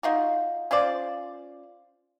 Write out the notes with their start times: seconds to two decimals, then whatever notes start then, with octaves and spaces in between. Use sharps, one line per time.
0.03 D#4 F4 F#4
0.71 C#4 F4 C5 D5